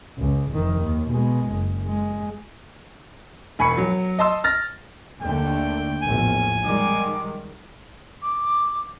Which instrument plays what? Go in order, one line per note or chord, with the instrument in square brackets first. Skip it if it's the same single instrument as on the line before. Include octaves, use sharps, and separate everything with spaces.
[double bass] C#2
F1 D#3
D#2
B2 G#3
F#1
G#3
[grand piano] E1 G#5 B5 C#6 C#7
F#3
D#5 A5 C6 E6
F6 A6 A#6
[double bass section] D#2 D3 A3 [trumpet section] G5
[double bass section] A#1 E2 A2 [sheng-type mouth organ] G#5
[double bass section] D#3 G3 G#3 [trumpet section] D6
[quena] D6